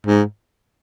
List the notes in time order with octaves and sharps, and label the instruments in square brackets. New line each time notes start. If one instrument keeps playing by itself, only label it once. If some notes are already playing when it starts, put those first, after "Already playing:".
[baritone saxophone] G#2